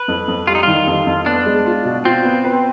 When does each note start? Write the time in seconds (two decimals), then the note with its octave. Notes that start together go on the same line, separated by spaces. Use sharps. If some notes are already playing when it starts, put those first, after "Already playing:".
Already playing: B4
0.08 F2
0.28 F2
0.47 G3 F4
0.55 D#4
0.63 D#3 F4
0.87 F2
1.07 F2
1.26 B3 D4
1.46 G#3
1.66 F4
1.85 B2
2.05 C4 F4
2.25 B3
2.44 B4